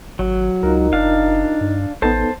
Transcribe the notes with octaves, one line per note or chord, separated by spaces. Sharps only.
G#1 F#3
C#2 D#4 F4 A#4
F#1 D4 F5
G2
A1 B3 D#4 A4 C5 A5